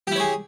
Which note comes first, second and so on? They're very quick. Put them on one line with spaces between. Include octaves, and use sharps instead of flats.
G4 E4 C#5 G#4